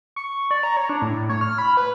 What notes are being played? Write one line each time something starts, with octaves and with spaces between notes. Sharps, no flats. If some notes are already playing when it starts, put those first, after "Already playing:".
C#6
D5
A#5
C#5
D4
A2
C#5
F6
B5
B4